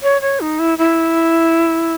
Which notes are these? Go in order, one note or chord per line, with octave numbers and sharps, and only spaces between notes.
C#5
C#5
D#4
E4
E4